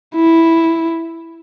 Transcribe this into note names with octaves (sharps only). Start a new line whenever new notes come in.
E4